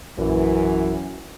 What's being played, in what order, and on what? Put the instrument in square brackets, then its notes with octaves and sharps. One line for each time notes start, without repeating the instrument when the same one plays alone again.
[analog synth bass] A#1 [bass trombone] F#2 [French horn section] E3